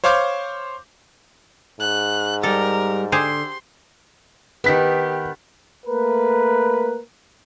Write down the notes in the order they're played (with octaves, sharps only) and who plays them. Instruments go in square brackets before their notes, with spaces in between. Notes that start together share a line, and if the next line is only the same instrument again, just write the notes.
[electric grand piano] C5 C#5 F5 C6 D6 G6
[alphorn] G#2 [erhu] F#6
[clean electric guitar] G3 G4 [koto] A4 [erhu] A#4
[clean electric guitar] D3 [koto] G4 G#4 C5 [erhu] C6
[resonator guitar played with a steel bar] D#3 B3 [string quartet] G4 [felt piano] B4 B6
[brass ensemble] A3 A#3 A#4 B4